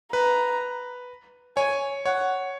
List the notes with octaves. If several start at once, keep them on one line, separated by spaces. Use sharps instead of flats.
B4 A#5
C#5 G#5
C#5 F#5